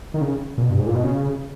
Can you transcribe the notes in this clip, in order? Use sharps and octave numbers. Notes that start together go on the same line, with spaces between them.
D#3
C#3
A#2
B2
G2
G#2
A#2
B2
C#3